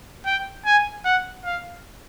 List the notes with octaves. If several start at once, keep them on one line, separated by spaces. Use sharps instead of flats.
G5
G#5
F#5
F5